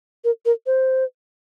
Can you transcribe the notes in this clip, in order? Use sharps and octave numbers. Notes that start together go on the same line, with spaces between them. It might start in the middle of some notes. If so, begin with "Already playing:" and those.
A#4
A#4
C5